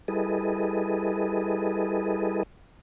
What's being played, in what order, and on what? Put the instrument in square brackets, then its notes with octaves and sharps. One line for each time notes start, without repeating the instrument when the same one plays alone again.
[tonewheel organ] G3 E4 G#4 A4 B4 D#5